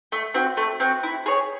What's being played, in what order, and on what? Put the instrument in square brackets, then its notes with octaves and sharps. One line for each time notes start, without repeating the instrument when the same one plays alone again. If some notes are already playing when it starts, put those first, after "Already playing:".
[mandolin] A3
C4 F#4
A3
C4 F#4
E4
G#4 C#5